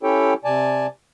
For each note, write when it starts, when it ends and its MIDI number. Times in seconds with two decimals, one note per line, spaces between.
0.03 0.34 61
0.03 0.34 64
0.03 0.34 67
0.03 0.34 69
0.03 0.34 73
0.03 0.34 79
0.45 0.87 48
0.45 0.87 74
0.45 0.87 80
0.45 0.87 81